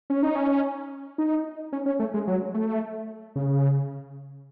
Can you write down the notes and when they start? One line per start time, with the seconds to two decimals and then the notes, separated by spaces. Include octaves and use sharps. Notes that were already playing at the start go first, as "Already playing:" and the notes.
0.10 C#4
0.23 D#4
0.35 C#4
1.18 D#4
1.72 C#4
1.86 C#4
1.99 A3
2.14 G#3
2.27 F#3
2.54 A3
3.36 C#3